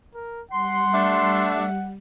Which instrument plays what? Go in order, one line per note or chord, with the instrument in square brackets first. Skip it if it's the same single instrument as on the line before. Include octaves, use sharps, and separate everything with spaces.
[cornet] A#4
[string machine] G3 [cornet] F#5 [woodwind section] C6
[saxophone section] A3 D4 E5